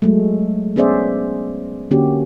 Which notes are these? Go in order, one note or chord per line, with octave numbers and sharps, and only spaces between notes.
F#3 G#3 A3
B3 C#4 G#4 C5 D5 E5
D3 A#3 C#4 F#4 G4